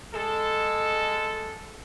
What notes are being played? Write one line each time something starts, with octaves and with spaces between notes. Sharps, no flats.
G#3 A4